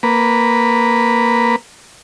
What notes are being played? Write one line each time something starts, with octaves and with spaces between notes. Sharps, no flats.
A#3 B4